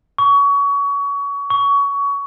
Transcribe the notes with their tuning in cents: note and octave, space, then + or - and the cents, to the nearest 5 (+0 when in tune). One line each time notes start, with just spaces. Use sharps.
C#6 +30
C#6 +25